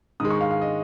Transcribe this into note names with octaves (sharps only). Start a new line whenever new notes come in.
G#2 D#3 G#3 D#6
C#6
F5
F5
D#5